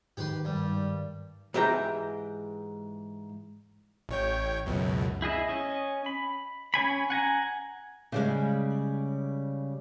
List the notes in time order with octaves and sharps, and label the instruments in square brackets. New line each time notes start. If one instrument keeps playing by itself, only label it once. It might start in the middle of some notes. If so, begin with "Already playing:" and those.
[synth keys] G#2 D#3 [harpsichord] G4 B4 C6
[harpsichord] G2 [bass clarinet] G3
[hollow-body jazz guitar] G#2 E3 G4 E5 G5 A#5
[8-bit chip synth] A1 C#5 G5
C#2 F#2 B2
[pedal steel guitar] E4 G#4 D#5 E5
C#4 D#5
B5
C#4 C#5 G#5 B5
F#5 G#5 A#5
[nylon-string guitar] C#3 G3 G#3